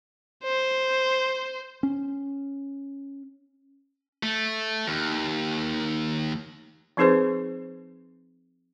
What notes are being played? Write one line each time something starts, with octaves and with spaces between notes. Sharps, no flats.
C5
C#4
A3
D#2
F3 C4 D#4 G#4 B4 C5